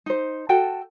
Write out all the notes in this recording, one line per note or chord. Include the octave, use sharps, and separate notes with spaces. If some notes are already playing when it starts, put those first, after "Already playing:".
D#4 C5
F#4 A4 G5 A5